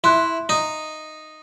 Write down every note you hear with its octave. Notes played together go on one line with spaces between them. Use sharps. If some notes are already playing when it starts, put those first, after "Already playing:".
E4 E5 C6 F#6
D#4